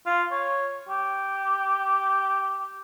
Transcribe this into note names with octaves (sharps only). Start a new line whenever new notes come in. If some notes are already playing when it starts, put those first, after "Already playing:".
F4
C#5
G4